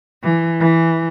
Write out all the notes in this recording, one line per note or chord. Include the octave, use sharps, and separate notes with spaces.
E3
E3